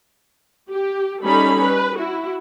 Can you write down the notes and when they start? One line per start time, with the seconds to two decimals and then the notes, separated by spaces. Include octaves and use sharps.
0.70 G4
1.22 G3 C#4 D#4 A4 B5
1.65 B4
1.96 E4 F#4